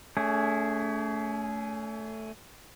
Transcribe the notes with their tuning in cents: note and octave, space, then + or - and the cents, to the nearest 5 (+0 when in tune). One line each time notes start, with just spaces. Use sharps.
A3 +0 C#4 +40 G#4 +0